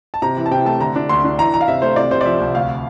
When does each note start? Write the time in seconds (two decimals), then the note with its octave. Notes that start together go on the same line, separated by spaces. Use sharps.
0.14 A5
0.22 C3 A#5
0.37 E3
0.46 A5
0.51 C3 G5
0.66 A3 A5
0.80 D3 A#5
0.96 D4
1.09 D2 C6
1.24 D4
1.38 E3 A#5
1.53 E3 A#5
1.61 F5
1.68 C3 E5
1.82 A3 C5
1.96 C3 D5
2.11 C3 C5
2.21 D5
2.26 F3 E5
2.40 C2
2.55 D2 F5